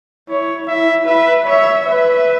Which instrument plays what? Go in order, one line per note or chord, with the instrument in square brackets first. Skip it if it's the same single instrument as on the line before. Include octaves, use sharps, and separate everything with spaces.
[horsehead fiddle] E4 [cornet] C#5
[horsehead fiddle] E4 [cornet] E5
[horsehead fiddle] B4 [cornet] E5
[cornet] C#5 [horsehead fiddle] E5
[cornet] B4 [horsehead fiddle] E5